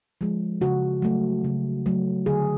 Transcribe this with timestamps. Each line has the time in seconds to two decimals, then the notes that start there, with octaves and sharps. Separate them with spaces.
0.21 F3 G#3
0.61 C#3 F#4
1.02 F#3 A3
1.44 C#3
1.86 F#3 A3
2.26 D3 G#4